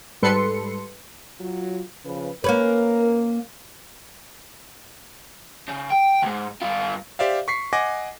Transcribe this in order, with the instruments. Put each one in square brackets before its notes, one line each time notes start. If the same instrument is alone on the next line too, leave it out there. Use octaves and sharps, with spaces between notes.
[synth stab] G#2 G3 A4 B4 C6 C#7
[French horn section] F#3 F4
C#3 F3 B4
[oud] A#3 C#4 B4 [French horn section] A#4
[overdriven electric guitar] C#3
G5
D2 G#2
G2 F4
[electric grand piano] G4 C5 D5 E5 F5
C#6 B6 C7
D#5 F#5 G#5 D6 A#6